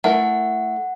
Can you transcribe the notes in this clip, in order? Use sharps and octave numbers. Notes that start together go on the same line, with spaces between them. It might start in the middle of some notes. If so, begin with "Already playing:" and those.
A3 E4 A#4 F#5